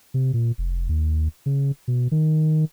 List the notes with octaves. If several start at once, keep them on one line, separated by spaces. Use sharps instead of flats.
C3
A#2
F1
D#2
C#3
B2
D#3